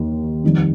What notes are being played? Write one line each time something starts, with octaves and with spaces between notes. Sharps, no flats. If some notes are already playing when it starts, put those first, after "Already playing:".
Already playing: D#2 A#3
F2 D#3 G3